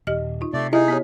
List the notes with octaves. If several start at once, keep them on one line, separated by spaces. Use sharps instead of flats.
D#1 G4 D#5 F6
D#4 F4
C3 A3 D5
D#4 E4 G4 G#4 D#5 E5
B3 G4 C#5